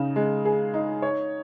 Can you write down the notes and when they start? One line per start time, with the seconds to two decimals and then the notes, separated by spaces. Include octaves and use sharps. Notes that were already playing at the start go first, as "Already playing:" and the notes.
Already playing: C#3 D#4
0.16 G#3
0.45 G#4
0.74 D#4
1.02 C#5